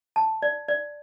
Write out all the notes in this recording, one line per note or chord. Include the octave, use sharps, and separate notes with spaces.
A5
D5
D5